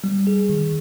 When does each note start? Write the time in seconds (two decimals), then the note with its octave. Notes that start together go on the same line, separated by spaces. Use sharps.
0.04 G3
0.27 G#4
0.50 D#3